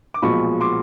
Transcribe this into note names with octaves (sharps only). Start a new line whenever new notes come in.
D6
B1 A#2 F3 G#3 B5 C#6
C6 D6